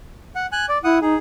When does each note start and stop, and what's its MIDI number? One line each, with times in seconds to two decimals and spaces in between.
0.35 0.46 78
0.52 0.66 80
0.52 0.66 90
0.69 0.78 74
0.84 0.99 64
0.84 0.98 78
0.84 0.98 87
1.02 1.16 63
1.02 1.18 68